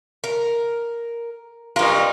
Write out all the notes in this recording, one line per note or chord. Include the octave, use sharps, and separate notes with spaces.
A#4
G2 D#4 F4 A#4